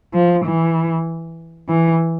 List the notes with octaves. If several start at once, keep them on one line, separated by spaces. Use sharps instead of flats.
F3
E3
E3